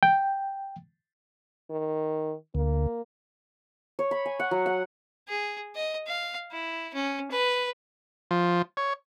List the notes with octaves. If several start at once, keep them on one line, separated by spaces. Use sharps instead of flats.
G5
D#3
D2 A#3
C#5
B5
G#5
F#5
F#3
F#5
G#4
D#5
F5
E4
C#4
B4
F3
C#5